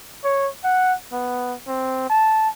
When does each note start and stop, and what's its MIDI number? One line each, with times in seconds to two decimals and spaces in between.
0.24 0.49 73
0.64 0.93 78
1.12 1.54 59
1.68 2.06 60
2.10 2.49 81